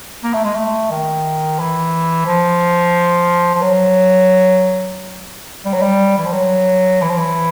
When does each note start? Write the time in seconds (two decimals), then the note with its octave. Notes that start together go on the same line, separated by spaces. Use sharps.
0.24 A#3
0.33 A3
0.44 G#3
0.55 A3
0.91 D#3
1.59 E3
2.26 F3
3.54 F3
3.62 F#3
5.65 G3
5.73 F#3
5.82 G3
6.18 E3
6.26 F3
6.33 F#3
7.02 E3
7.10 F3
7.18 E3